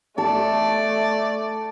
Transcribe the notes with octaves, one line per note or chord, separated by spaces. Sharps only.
A3 A4 D5